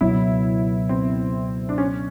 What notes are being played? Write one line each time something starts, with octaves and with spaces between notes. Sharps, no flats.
C#2 B2 F#3 B3 E4
C4
D4
C#4